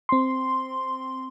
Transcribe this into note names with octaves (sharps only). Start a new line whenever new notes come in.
C4 C6